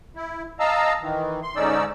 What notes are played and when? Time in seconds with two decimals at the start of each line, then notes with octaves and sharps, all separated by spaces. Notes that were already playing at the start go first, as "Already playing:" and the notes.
0.16 E4
0.60 D#5 F5 A5 A#5 E6
1.02 D#3 E3
1.42 C6
1.56 G#2 D3 C#4 D#4 D5 E6